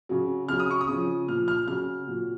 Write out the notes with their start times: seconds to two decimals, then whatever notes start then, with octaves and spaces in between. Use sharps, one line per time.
0.09 C#3 F#3
0.48 C#3 F#3 F6
0.60 D#6
0.71 C#6
0.81 D#6
0.88 C#3 F3
1.28 A#2 F3 F6
1.48 F6
1.67 C#3 F#3 F6
2.07 A#2 F#3